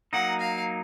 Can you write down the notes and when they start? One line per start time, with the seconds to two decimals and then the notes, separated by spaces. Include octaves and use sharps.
0.13 F#3 A#3 D#4 F#5
0.40 F5